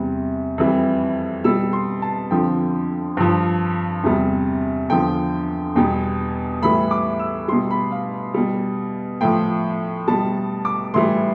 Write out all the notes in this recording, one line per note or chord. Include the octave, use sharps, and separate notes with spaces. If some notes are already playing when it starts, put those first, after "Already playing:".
Already playing: E2 C3 G3
F2 E3 G3
B2 G3 E6
C6
A5
F2 D3 F3 G5
G2 F3
E2 C3 G3
E2 D3 F3 G5
E2 B2 G3 G5
A2 E3 G3 B5
D6
E6
B2 G3 C6
B5
F5
B2 G3
A2 F3 G5
B2 G3 A5
D6
A2 E3 G3 C6